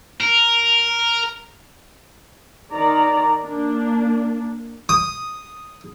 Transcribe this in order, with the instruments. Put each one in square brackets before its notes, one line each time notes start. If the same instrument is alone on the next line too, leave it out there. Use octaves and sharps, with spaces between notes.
[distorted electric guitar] A#4
[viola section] D#3 D5 A#5
A#3 D4
[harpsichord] D#6